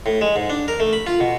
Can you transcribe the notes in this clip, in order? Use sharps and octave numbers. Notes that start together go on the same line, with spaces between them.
A2
G#3
G#2
D4
A#4
A3
B5
F4
B2